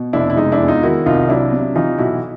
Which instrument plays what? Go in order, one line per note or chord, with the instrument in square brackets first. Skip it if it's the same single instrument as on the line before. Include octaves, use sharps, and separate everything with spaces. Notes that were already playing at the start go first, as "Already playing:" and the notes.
Already playing: [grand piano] B2
F1 D4 E4
E4
G#3 D#4
D4 E4
E2
D#4 F4
D#3 E4 F#4
C2 D#4 F4
F#3 D4 E4
C3
E3 D#4 F4
B1 E4 F#4